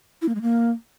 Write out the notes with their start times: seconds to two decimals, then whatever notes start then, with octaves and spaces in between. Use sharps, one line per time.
0.22 E4
0.28 A#3
0.35 G#3
0.42 A#3